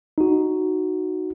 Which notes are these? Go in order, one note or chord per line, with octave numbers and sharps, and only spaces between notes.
D#4 F#4